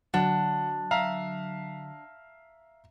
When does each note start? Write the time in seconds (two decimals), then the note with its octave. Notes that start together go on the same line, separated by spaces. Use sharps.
0.14 D3 F#3 D4 F#5
0.91 E5 F5 A#5